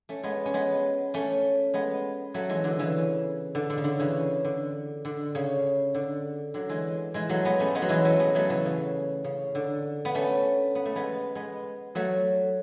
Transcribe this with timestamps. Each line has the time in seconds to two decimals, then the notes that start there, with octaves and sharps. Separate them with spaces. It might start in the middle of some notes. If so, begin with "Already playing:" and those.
0.09 A3 C#4
0.23 G#3 B3
0.46 C#4
0.54 G#3 B3
1.14 A3 C#4
1.74 G#3 B3
2.34 F#3 A3
2.49 E3 G#3
2.64 D3 F#3
2.79 C#3 E3
3.55 D3
3.70 D3
3.78 C#3
3.84 D3
4.00 C#3 E3
4.45 D3
5.05 D3
5.35 C#3
5.94 D3
6.54 D3 F#3
6.69 E3 G#3
7.14 E3 G#3
7.29 F#3 A3
7.45 G#3 B3
7.59 A3 C#4
7.75 G#3 B3
7.82 F#3
7.89 E3 G#3
8.04 F#3 A3
8.19 G#3 B3
8.35 F#3 A3
8.49 C#3 E3
8.65 C#3
9.24 C#3
9.55 D3
10.05 B3
10.15 A3 C#4
10.75 B3
10.85 A3
10.96 G#3 B3
11.35 G#3 B3
11.95 F#3 A3